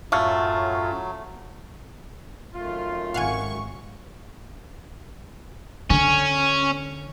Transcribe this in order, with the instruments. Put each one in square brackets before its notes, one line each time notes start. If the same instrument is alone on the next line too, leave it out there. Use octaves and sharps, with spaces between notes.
[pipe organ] F#2 A2 F4 [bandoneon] F#3 [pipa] A3 [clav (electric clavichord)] C#5 F5
[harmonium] F#2 D#3 A3 [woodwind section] F4
[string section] G#1 C#6 [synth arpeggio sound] F5 F#5 G#5
[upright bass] D3 [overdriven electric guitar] C#4